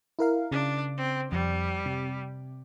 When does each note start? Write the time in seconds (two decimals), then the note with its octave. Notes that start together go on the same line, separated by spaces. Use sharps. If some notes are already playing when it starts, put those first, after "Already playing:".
0.19 E4 A#4 F5
0.51 C#3 D4
0.98 C4
1.32 F2 G3
1.86 C3